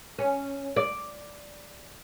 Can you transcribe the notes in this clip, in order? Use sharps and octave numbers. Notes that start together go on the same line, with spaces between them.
C#4
D5